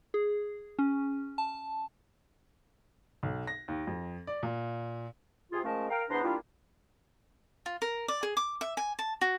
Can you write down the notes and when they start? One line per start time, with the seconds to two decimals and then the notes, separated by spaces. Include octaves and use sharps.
0.14 G#4
0.79 C#4
1.38 A5
3.23 B1
3.47 A#6
3.68 D#2
3.87 F2
4.27 D5
4.43 A#2
5.51 C3 F4 G#4
5.64 F3 G#3 A3 C#4 A#4 A5
5.90 A#4 F5 G5
6.10 E2 B3 D4 C5 A#5 C6
6.23 G3 A#3 D4 E4 F4
7.66 F4
7.82 A#4
8.08 D5
8.23 G#4
8.37 D6
8.61 E5
8.77 G#5
8.99 A5
9.21 F#4